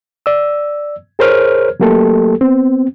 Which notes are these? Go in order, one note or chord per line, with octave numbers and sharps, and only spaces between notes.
D5 E6
G#4 A#4 C5 C#5 F6
F#3 A3 A#3 G4 A4
B3 C4